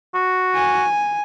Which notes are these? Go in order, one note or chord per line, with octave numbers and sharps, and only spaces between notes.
F#4
G#5